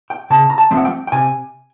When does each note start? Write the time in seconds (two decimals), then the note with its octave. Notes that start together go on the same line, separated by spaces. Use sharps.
0.10 G5
0.30 C#3 A5
0.50 A#5
0.58 A5
0.71 F3 A3 C4
0.77 F#5
0.85 G5
1.07 G5
1.12 C3 G#5